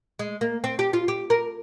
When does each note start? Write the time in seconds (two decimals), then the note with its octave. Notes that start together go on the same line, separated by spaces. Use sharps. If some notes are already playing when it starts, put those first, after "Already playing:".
0.19 G#3
0.41 A#3
0.64 C4
0.79 G4
0.93 F4
1.08 G4
1.30 A#4